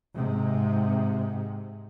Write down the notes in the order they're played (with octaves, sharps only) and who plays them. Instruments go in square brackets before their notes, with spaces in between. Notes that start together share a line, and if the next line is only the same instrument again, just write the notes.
[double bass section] G#2 C3